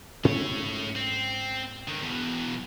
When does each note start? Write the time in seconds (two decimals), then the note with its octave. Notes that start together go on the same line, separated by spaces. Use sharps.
0.25 G#2 A3 C#4 C#5
0.96 C4
1.88 D3 D#3
2.02 E2 B2